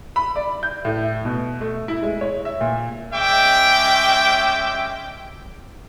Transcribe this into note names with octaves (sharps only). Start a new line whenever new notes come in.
B5
D5
G6
A2
B2
A3
E4
G#3
C#5
E5
A#2
G#3 C#4 E5 G5 D6